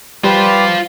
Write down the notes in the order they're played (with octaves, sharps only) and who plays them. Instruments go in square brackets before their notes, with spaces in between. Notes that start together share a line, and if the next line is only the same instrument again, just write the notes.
[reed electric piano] G3 [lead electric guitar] F4 C5 [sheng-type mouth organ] G4 B4 D5